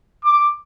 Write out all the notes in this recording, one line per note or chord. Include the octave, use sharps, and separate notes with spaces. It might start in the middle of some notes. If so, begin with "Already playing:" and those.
D6